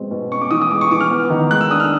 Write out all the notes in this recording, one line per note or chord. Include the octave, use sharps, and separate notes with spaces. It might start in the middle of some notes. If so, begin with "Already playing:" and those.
Already playing: B2 G#3 C4
B2
C#4 C#6
D6
E3 D#6
D#6
G#3 D6
C#6
E3 D6
F6
B3
D#3
G#3 F#6
E6
D4 D#6
F6